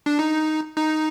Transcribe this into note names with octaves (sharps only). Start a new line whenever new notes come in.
D4
D#4
D#4